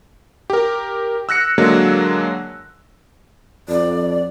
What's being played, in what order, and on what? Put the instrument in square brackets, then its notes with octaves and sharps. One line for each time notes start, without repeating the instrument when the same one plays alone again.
[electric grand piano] G4 A#4
E6 F#6 A#6 C#7
D3 F#3 G#3 A#3
[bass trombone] F2 [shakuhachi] D5